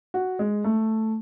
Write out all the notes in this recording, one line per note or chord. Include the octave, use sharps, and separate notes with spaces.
F#4
G#3
A3